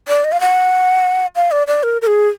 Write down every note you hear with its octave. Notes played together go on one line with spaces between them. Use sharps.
D5
D#5
F5
F#5
F5
D5
D5
A#4
A#4
G#4